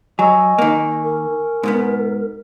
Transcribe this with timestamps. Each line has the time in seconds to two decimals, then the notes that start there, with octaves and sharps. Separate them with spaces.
0.19 F#3 D#5 G#5 C#6 E6
0.58 D#3 A#3
1.04 A#4
1.63 G#2 B2 B3